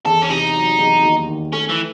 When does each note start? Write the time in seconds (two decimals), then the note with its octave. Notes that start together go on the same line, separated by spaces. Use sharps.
0.05 E2 A4
0.22 C#4
0.30 C3 D#4
0.55 F#3
0.78 E2
1.03 D#2
1.28 D#3
1.53 A3 C#4
1.69 E3